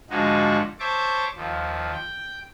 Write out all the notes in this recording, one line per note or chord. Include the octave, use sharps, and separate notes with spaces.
G#2 D3 F3 G#3 D#4 F#4
C5 C#5 E5 A5 C#6 D6
D#2 F3
G5